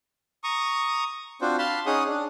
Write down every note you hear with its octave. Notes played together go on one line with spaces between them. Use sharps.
A#5 C#6 D#6
C4 D4 F4 F#4 C5
F5 A5 B5 C6
C#4 D#4 G#4 F#5 D#6
D4